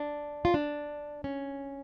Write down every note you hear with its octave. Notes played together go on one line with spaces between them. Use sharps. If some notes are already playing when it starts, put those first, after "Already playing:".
Already playing: D4
F4
D4
C#4